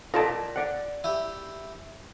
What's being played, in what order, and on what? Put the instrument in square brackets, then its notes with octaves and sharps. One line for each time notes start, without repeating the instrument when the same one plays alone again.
[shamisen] F4 A4 A5 [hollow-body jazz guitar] A#4 D5 D#5
[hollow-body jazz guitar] D5 F#5
[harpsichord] E4 G4